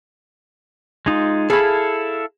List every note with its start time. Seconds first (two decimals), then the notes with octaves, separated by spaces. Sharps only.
1.06 G#3 D#4 F4
1.50 E4 G#4 A4 F5 B5